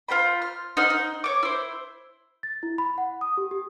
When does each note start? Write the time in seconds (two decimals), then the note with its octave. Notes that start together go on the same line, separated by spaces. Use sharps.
0.09 F4 C5 G5 B5
0.42 F6
0.77 D#4 C5 F#5 F6
0.90 D#4
1.24 C#5 D6
1.43 E4 C5
2.43 A6
2.63 E4
2.78 B5
2.98 F#5
3.21 D#6
3.37 G4
3.51 G4